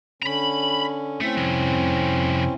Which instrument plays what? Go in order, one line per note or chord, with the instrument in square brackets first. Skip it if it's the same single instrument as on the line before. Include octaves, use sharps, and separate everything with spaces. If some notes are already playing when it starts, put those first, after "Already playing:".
[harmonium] D3 C#4 [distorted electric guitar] A#5 B5
[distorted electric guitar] A3 [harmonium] C4 C#4 E4
[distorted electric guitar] C2 F2